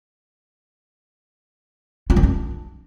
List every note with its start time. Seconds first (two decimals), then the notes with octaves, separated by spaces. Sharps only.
2.10 F4
2.16 D#3
2.23 D4